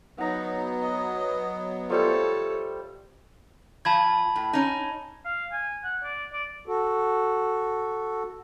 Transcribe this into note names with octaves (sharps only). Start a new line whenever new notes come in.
F#3 B3 D#4 F#5 A#5
D#5
F3 G3 A3 A4 C#5
F3 A5 B5 G#6
A2
C#4 D#4
F5
G#5
F#5
D5
D5
F#4 A4